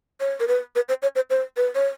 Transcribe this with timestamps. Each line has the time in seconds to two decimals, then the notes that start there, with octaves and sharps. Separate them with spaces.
0.20 C#5
0.40 A#4
0.48 B4
0.76 B4
0.89 C5
1.02 C#5
1.15 C5
1.30 C5
1.57 B4
1.75 C#5